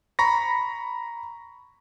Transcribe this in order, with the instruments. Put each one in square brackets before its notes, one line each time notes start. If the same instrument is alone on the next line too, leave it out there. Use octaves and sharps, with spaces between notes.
[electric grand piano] A#5 B5 C#6 A#6